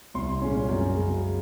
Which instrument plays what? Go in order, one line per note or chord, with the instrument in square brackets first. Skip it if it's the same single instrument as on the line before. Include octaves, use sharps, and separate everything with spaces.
[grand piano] C2 C6
A#2 G#3 C#4
F#2
C#3 G#3